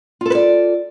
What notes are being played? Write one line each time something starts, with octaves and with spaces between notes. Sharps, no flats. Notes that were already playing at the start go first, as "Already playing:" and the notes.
F4 A4 B4 D5